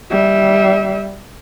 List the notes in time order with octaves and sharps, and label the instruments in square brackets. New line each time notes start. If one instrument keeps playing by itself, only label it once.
[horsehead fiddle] G3 E5